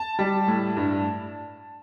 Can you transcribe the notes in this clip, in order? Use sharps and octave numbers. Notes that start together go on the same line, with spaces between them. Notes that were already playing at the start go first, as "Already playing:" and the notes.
Already playing: A5
G3
A2
G2